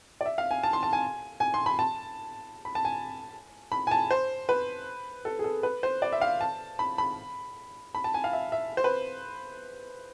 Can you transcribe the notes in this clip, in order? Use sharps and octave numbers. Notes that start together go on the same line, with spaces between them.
D5
E5
F5
G#5
A5
C6
A5
G#5
G#5
C6
B5
A5
B5
A5
G#5
B5
G#5
A5
C5
B4
A4
G#4
A4
B4
C5
D5
E5
F5
A5
B5
B5
B5
A5
G#5
F5
E5
E5
C5
B4